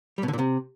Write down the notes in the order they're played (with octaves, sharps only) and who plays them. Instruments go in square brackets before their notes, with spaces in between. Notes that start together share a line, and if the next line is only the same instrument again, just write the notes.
[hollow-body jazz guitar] G3
B2
D3
A#2
C3